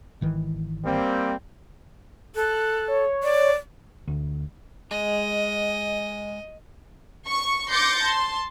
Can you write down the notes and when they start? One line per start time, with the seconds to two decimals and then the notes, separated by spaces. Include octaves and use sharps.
0.21 G#1 D#3 E3
0.85 G3 A#3 C4
2.35 A4 F#6
2.88 C#5
3.23 D5
4.08 D2
4.91 G#3 D#5
7.27 C#6
7.71 C6 D6 G6 A6 A#6 C#7
8.02 A5 C6